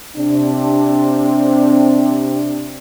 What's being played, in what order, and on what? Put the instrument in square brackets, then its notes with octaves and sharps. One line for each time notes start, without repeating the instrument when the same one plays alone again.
[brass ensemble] C3 C4 D4